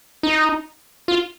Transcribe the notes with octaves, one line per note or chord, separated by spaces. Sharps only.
D#4
F4